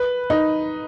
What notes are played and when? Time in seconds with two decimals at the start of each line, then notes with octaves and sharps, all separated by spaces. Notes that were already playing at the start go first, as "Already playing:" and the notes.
Already playing: B4
0.30 D#4